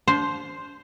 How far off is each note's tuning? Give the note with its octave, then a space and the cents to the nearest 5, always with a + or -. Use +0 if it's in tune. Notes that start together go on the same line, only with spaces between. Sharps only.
D4 -30 C5 +0